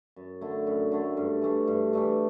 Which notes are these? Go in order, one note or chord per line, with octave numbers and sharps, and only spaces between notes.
F#2
D3 A3 E4
F#2
D3 A3 E4
G2
E3 A3 D4
G2
E3 A3 D4